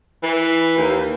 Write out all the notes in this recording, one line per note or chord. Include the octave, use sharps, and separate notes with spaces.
E3
D#2